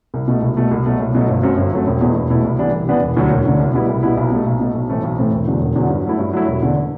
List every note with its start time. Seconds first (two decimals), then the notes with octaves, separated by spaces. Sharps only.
0.14 C2
0.28 B2 A3
0.42 C2
0.57 B2 A3
0.71 C2
0.86 B2 F#3 A3
1.00 C2
1.15 B2 F#3 A3
1.29 G1
1.43 F#2 F#3 A3 C4
1.58 G1
1.72 F#2 F#3 A3 C4
1.87 E1
2.01 E2 B2 A3 E4
2.15 E1
2.30 E2 B2 A3 E4
2.44 C2
2.59 C3 E3 B3 D4
2.73 C2
2.88 C3 E3 B3 D4
3.02 E1
3.17 D2 D3 F#3
3.31 E1
3.45 D2 D3 F#3
3.59 C2
3.74 B2 G3 B3 E4
3.89 C2
4.03 B2 G3 B3 E4
4.17 B1
4.32 B2 A3
4.46 B1
4.60 B2 A3
4.74 B1
4.89 A2 E3 A3 C4
5.03 B1
5.18 A2 E3 A3 C4
5.32 E1
5.47 E2 D3 F#3
5.61 E1
5.75 E2 D3 F#3
5.90 G2
6.04 F#3 A3 E4
6.19 G2
6.33 F#3 A3 E4
6.48 E1
6.62 E2 D3